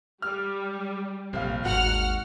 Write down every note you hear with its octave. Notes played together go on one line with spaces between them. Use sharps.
G3 F6
F1 A#1 F4 F5
G#1 D#2 F#4 F#5 F6